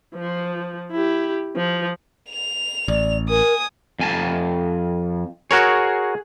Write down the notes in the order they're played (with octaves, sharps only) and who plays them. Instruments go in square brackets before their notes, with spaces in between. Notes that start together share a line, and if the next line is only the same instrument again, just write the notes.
[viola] F3
E4 G4
F3
[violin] F7
[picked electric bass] A1 [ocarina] D5
[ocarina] A#4 [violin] G#5 D#6
[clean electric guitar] F2 G#5 A5
[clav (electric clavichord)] F#4 A#4 C#5 [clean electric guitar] G#4